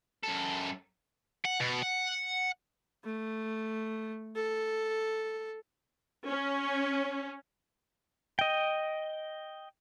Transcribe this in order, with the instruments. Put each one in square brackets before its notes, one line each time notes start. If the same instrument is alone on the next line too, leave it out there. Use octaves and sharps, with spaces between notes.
[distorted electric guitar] F#2 A4
F#5
B2
F#5
[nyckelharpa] A3
A4
[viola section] C#4
[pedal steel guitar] D#5 G5